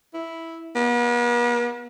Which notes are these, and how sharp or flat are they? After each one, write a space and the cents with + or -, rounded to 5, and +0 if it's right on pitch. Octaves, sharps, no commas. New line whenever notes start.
E4 -5
B3 -45